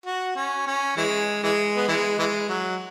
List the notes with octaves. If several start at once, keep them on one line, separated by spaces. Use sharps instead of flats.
F#4
C#4
C#4
E3 G#3
E3 G#3
B3
E3 G#3
E3 G#3
F#3